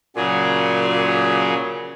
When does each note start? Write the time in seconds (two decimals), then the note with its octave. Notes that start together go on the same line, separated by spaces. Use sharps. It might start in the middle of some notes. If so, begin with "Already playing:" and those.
0.16 A#2 C#3 F#3 G#4